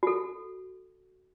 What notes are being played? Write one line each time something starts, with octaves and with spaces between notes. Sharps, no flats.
F#4 A4